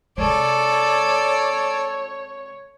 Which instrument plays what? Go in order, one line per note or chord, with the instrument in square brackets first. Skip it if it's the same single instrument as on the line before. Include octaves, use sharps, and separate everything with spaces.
[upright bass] C3 G#3 [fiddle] A4 D5 [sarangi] C#5